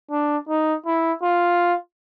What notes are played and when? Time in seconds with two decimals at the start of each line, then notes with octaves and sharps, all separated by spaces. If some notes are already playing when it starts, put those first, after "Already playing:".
0.11 D4
0.49 D#4
0.86 E4
1.23 F4